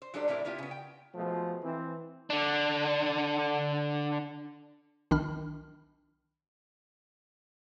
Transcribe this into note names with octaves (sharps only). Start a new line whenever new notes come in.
C5
F#3 G3 D4 A4 C5 D5
A2 G3 C4 E4 A#4 D5
A#3 B3 E4 F4 G4
C#3 B3
G5
B2 F3 G#3 A3
E3 C4
D3 D4
B1 D#3 D4 B5 F6